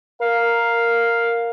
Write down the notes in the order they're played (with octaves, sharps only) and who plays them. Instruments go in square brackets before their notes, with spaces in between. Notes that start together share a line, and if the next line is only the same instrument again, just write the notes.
[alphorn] A#4 [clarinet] F5